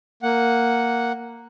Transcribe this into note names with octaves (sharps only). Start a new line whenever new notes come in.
A#3 F#5